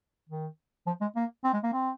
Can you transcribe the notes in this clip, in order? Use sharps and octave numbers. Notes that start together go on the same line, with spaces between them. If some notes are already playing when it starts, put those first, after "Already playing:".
D#3
F3
G#3
A#3
C4
G#3
A#3
C4